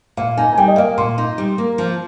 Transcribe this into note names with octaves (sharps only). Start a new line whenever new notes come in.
A#2 F5
D#4 G#5
G#5
G3 G5
D#5
A#3 F5
A#2 C6
D#4
G3
A#3
F3